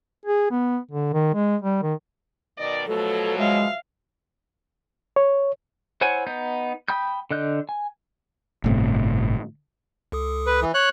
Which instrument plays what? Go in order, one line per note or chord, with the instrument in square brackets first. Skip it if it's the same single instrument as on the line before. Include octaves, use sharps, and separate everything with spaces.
[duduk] G#4
B3
D3
D#3
G#3
G3
D#3
[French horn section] B2 D#3 D5 [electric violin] D#5
[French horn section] B2 F3 F#3 [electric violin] A3 [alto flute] A4
[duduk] G#3 [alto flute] E5 [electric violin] F5
[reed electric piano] C#5
[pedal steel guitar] E4 C5 C#5 F#5 G#5
B3 D#4 G6
G5 B5 D#6 G6
D3 D#5 F#6 G6
G#5
[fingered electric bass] G1 A2 C3
[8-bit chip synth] C#2 A4 D#6
[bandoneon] B4
E3
C#5 F#6